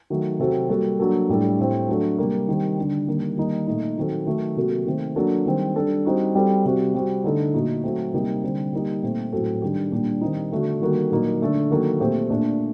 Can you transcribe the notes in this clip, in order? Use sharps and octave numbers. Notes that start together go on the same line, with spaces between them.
D#3 F#3 A3
C3 F#3 C4 F#4 A4
G3 A#3 F#4 A4
F#3 A#3 D4 A4
A2 G3 D4 A4
A2 A3 C4 G4
F#3 A3 D4 A4
C3 G3 A#3
D#3 G3 C4 G4
D3 G3 D4
D#3 G3 A#3
D#3 G3 A#3 D#4
A#2 A3 D#4
D#3 F#3 C4 F#4 A4
D#3 F#3 A3
C3 F#3 A#3 F#4 A4
D#3 A3 C4
F#3 A#3 D4 A4
D#3 G3 C4
G3 D4 A4
G3 C4 D#4 F#4
G3 C4 F#4 A4
C3 G3 C4 F#4
G3 C4 F#4
D3 A3 D#4 A4
A#2 A3 D#4 F#4
F#3 A3 C4
C3 G3 A#3 D#4 G4
D3 G3 C4
G3 A#3 D#4 G4
A#2 A3 C4
A2 F#3 C4 F#4 A4
D#3 G3 D4 G4
A#2 G3 D4 G4
D#3 G3 C4 D#4
D3 A3 D4 F#4
D#3 G3 A#3 F#4 A4
A#2 F#3 A#3 D#4
D3 A3 D4 A4
D#3 F#3 A#3 F#4 A4
A#2 A3 C4 G4
A#2 A3 D4